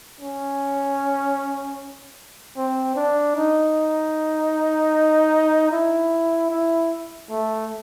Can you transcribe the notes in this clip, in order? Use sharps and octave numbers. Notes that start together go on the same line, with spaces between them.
C#4
C4
D4
D#4
E4
E4
A3